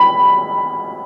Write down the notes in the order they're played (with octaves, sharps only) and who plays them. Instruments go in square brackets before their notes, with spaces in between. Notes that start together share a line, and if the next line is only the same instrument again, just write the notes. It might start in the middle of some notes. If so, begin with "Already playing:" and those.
Already playing: [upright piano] B5